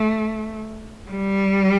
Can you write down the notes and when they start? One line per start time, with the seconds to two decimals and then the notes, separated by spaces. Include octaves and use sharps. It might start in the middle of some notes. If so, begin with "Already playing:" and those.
Already playing: A3
1.11 G3